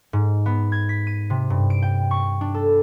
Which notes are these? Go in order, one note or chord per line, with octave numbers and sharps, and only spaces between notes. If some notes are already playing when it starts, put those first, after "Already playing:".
G#2
B3
G#6
B6
D#7
C3
G2
D7
G5
C#6
D4
A4